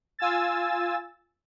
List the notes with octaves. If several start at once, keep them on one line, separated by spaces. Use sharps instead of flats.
F4 G#5 E6 A6